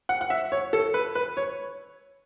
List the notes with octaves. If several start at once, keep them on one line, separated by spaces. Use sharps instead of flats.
F#5
F#5
E5
C#5
A4
B4
B4
C#5